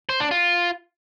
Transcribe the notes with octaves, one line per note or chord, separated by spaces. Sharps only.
C5
D4
F4